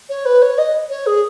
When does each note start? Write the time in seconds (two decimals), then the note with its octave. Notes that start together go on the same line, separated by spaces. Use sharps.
0.09 C#5
0.25 B4
0.42 C#5
0.58 D#5
0.90 C#5
1.06 G#4